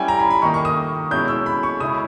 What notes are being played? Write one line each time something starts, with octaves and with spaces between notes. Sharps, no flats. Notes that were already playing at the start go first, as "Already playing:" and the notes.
Already playing: G3 C#4 E4 G5 G#5
A#5
B5
B5
D#3 A#3 D#4 C#6
C#6
D#6
B2 G#3 C#4 E4 G6
E6
B5
C#6
C#3 G#3 C#4 E4 D#6